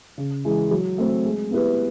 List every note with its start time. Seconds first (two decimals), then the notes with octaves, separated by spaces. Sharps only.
0.18 C#3
0.45 E3 G#3
0.71 F#3
0.98 A3 C4
1.25 G#3
1.51 B3 E4 G4 B4